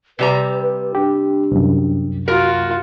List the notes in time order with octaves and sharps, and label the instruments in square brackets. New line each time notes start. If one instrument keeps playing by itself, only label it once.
[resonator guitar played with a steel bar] C3 G3 A#5 [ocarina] B4
[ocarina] D4 [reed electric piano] G4
[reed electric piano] C2 F#2
[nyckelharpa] F4 F#4 [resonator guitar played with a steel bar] A#4